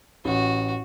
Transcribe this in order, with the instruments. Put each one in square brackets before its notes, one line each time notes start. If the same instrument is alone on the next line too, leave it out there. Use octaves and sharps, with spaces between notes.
[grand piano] A1 [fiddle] F#4